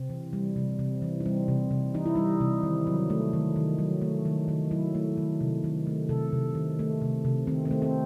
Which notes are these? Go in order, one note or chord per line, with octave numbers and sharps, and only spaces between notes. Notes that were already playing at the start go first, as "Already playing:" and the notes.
Already playing: C3 C4
E3
G3
C3
C3
E3
D#4
G3 C4
C3
C3
E3 D#4
E4
G3 D#4
C3
D#3
F#3
A3
D#3
D#3
F#3
A3
D#3
D#3
F#3 E4
A3
D#3
C3
D#3
A3
C3 A4
C3
D#3
A3
C3
C3
D#3 C4
C4
A3
C4